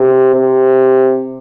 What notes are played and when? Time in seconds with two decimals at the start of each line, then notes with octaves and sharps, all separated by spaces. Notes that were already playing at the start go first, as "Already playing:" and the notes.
Already playing: C3
0.34 C3